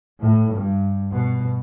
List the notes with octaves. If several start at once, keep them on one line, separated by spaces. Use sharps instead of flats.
A2
G2
B2